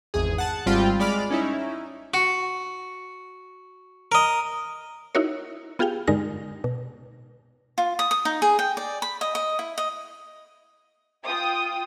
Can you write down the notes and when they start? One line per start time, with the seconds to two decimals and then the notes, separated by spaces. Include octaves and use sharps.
0.14 G#1 E2 G#4
0.38 F#5 A5
0.66 G#1 G3 C4 F4 G5 B5
1.00 G#3 D5 B5 D6 F6
1.31 C#4 D#4 E4
2.14 F#4
4.12 A#4 D#5
5.15 D#4 E4 F#4 A#4 C#5
5.79 B3 F4 G4 G#4 F5 G5
6.07 G2 D3 G#3 D#4 A#4 A#6
6.64 B2
7.78 F4
7.99 D#6
8.11 D#6
8.25 D#4
8.42 G#4
8.59 G5
8.77 D5
9.02 B5
9.21 D#5
9.35 D#5
9.59 E4
9.78 D#5
11.24 F4 G5 D#6